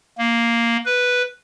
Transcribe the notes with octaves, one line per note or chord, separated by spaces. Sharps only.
A#3
B4